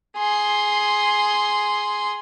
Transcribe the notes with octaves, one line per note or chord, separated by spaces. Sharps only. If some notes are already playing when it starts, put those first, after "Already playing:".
G#4 C6